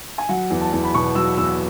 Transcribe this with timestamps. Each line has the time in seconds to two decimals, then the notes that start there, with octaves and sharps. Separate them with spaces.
0.18 G#5
0.29 F#3 F#5
0.50 E2
0.61 A5
0.72 E2
0.83 B5
0.94 B2 C#6
1.15 F#3 E6
1.37 E2 E6